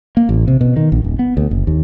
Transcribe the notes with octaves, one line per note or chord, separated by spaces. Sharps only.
A#3
A1
C3
B2
D#3
A#1
D#1
B3
D2
F#1
D#2